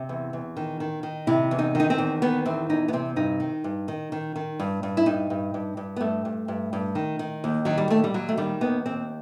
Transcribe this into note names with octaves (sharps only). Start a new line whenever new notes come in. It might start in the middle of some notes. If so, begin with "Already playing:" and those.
Already playing: C3 C4
E2
E2
D#3
D#3
D#3
C3 E4
E2
D#4
D#3 D#4
C4
E2
D#3 B3
E2 C4
E2 D#4
B3
C3 C4
G2 D#4
D#3
G2
D#3
D#3
D#3
G2
G2
E4
G2 D#4
G2
G2
G2
B3
G2 A3
G2
G2
G2
D#3
D#3
D#2
D#3 F#3
G3
D#2 A3
G3
D#2 F#3
A3
D#3 G3
D#2 B3
D#2 C4